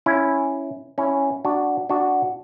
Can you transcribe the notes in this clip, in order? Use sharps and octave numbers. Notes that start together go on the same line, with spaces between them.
C#4 E4
C#4 E4
D4 F#4
D4 F#4